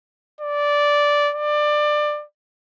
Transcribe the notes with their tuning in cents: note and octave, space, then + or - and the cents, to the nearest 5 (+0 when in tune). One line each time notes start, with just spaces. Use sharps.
D5 -10
D5 +20